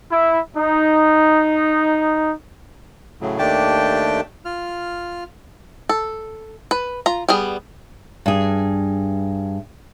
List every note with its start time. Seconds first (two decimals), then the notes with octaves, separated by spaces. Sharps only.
0.10 E4
0.57 D#4
3.21 A2 C#3 F#3
3.39 D#2 A3 D4 G4 G5 A5
4.45 F4 F6
5.89 A4
6.71 B4
7.06 F4 A#5
7.29 G3 B3 G#4
8.26 G2 G#4